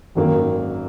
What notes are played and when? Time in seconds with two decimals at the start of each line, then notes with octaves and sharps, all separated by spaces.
0.15 G#1 F#2 D#3 A#3